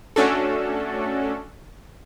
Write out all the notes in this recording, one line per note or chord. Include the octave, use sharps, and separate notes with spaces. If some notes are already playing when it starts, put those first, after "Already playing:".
A3 C#4 D4 F#4 A4